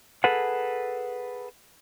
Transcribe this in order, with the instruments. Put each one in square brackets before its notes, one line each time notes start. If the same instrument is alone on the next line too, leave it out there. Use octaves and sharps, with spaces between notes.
[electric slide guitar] G#4 A4 B4 F#5